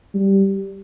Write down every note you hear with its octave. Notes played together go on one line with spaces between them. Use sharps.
G3